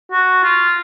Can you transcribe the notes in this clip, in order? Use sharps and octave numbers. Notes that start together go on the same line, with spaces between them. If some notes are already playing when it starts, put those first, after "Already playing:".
F#4
F4